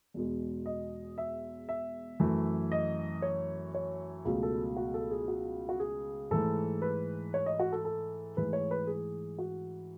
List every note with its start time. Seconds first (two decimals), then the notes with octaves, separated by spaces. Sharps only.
0.14 E2 B2 G#3
0.66 D#5
1.18 E5
1.69 E5
2.20 F#2 E3 A3
2.72 D#5
3.22 C#5
3.75 C#5
4.25 C#2 B2 F#3 A3
4.43 A4
4.77 F#4
4.94 A4
5.11 G#4
5.28 F#4
5.69 F#4
5.80 G#4
6.31 G#2 E3 A3 A4
6.82 B4
7.34 C#5
7.46 D#5
7.60 F#4
7.72 A4
7.85 A4
8.37 G#2 E3 A3 B4
8.53 C#5
8.71 B4
8.87 G#4
9.39 F#4